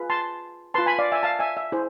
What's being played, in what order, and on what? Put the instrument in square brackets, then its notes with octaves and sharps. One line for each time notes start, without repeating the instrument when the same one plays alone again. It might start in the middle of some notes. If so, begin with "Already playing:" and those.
Already playing: [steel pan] F4 G#4 B4
A5 C6
F4 B4 A5 C6
G#5 B5
D5 F5
E5 G#5
F5 A5
E5 G#5
E5
E4 G#4 C5